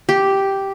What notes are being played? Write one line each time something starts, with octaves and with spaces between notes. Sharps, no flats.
G4